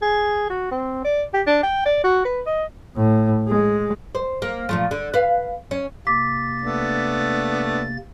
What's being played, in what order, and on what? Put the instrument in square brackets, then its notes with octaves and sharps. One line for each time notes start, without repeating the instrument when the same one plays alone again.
[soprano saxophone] G#4
F#4
C4
D5
G4
D4
G5
D5
F#4
B4
D#5
[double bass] A2
G#3
[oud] C5
A#3
A#2 F3 A3
D3
B4 F5
C#4
[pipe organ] C3 A#3 A6 [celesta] D6 B6
[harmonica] A3 B3 D4